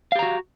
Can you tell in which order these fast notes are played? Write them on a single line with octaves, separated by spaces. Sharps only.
F5 G4 A#5 F#4